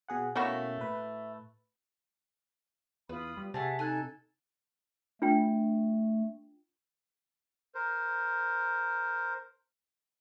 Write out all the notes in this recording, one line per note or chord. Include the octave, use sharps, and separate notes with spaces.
B2 G#4 F#5
B2 A3 A#3 C#4 E4 F#4
A2 B4
E2 F4 B4 B5 D#6
G3
C3 A3 G#4 E5 F#5 A5
D#4 A4 G#5 F#6 G#6
A3 D4 F4 G5
A#4 C5